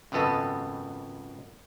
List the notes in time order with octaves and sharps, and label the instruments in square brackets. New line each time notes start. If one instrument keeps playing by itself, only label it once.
[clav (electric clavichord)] G#1 C#2 F#2 B3 A4 D#5